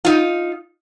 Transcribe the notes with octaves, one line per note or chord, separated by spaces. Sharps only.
D#4 F4